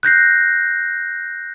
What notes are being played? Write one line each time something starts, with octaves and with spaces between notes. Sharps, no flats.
F#6 G6 A#6 C7